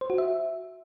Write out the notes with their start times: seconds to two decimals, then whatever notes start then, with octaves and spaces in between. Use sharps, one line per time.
0.01 C5
0.10 F#4
0.18 E5